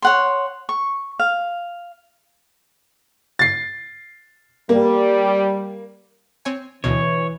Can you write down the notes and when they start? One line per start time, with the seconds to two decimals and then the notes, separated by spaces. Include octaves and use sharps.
0.02 C#5 F#5 C6
0.69 C#6
1.19 F5
3.39 A6 C7
4.69 G3 A#3
6.45 C4 C#5 G#5
6.84 D2 B2 E3 C#5